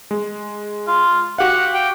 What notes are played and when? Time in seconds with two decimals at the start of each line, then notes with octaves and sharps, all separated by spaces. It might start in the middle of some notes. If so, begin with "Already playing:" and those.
0.11 G#3
0.87 F4
1.38 F#4 G4 F5 F#5
1.74 G5